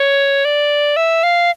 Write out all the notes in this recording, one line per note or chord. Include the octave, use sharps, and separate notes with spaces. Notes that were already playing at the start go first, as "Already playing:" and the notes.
Already playing: C#5
D5
E5
F5